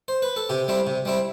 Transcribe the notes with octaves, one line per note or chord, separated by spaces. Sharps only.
C5
B4
A4
C3 G4
G3 C4 E4
C3
G3 C4 E4